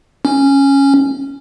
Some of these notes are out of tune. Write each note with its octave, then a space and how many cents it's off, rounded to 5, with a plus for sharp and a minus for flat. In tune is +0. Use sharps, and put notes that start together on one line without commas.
C#4 -5